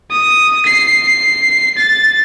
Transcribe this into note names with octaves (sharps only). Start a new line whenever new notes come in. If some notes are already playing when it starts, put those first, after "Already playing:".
D#6
C7
A6